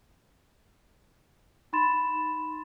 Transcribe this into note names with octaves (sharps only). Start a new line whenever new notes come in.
D#4 B5 C6 A6 E7